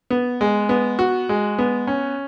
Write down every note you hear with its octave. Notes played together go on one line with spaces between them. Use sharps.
B3
G#3
B3
F#4
G#3
B3
C#4